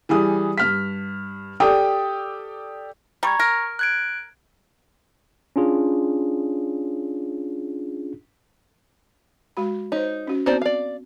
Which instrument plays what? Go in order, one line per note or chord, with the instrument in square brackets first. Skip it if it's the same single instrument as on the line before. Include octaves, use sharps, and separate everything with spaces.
[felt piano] E3 G3 G#4 D#6
G2 F6 B6
G4 A4 D5 G5 D#6
[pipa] G3 [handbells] A#5 C#6 G#6
[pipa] A#4
[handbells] F#6 G#6 D7
[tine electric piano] C#4 D4 F4 G#4
[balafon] G#3 F#4 B5
[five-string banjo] D#4 [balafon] C5 C#5
[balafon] C#4 F#4
[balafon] B3 C4 F#4 [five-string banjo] D#4 C5 D5
[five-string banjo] D5 F5